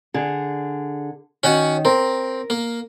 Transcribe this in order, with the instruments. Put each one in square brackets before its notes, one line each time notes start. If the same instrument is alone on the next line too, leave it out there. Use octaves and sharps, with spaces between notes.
[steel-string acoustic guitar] D3 G#4
[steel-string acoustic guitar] D#3 [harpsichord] C#4 F#4 F#5
[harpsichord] C4 [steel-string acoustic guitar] A#4
[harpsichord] A#3